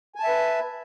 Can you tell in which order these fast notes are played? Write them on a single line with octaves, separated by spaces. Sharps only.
G#5 A5 E5 B4